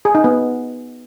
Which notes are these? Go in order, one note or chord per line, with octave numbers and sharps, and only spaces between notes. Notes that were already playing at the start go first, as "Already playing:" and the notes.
G#4
D#4
B3